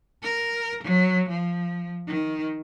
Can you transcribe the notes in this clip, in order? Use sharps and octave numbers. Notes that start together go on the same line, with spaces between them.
A#4
F#3
F3
D#3